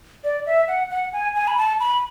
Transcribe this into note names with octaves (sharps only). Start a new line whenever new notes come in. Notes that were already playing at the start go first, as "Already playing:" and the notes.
D5
E5
F#5
F#5
G#5
G#5
B5
A5
B5